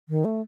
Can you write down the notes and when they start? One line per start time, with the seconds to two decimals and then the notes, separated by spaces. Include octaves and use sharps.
0.09 D#3
0.25 A3